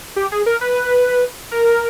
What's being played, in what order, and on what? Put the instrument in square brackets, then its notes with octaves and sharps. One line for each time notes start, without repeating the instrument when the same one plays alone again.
[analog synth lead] G4
G#4
A#4
B4
A#4